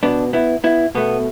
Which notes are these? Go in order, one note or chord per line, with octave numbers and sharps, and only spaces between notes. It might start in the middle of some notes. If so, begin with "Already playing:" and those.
B2 B3 D4
B3 E4
B3 E4
B2 A3 B3